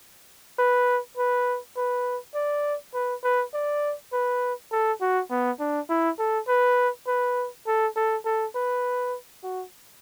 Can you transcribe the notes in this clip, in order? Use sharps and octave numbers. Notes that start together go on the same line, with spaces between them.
B4
B4
B4
D5
B4
B4
D5
B4
A4
F#4
B3
D4
E4
A4
B4
B4
A4
A4
A4
B4
F#4